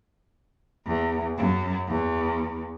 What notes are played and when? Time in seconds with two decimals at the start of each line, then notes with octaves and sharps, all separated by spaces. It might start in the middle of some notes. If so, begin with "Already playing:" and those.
0.86 E2
1.37 F#2
1.88 E2